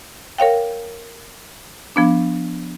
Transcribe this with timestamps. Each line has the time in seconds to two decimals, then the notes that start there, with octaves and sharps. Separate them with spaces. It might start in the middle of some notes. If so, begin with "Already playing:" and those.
0.38 A#4 C#5 F5 G5
1.96 F3 B3 D4